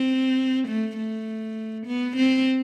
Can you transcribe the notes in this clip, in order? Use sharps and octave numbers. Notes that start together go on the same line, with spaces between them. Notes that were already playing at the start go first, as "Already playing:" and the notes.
Already playing: C4
A3
A3
B3
C4